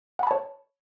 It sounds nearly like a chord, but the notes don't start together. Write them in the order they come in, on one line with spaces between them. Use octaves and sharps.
F#5 B5 A5 C#5